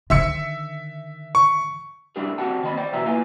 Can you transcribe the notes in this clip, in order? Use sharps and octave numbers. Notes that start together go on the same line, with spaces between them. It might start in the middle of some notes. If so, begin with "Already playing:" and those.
D3 D#3 E5 E6 C#7
C#6
G3 D4 E4 G4 G#4 A#4
G3 C4 F#4 F#5 G5 A5
D#2 D#3 C4 D#5 B5
C5 D5 G5
E2 B2 G3 G#4 E5 A#5
A#3 E4 F4 B4 F5 G#5